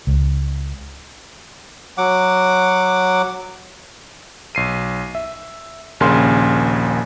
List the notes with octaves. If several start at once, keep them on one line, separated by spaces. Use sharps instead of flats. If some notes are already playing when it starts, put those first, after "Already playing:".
C#2
F#3 F#5 D6
B1 C7 D#7
E5
A#1 D#2 C#3 A#4 G#5 C6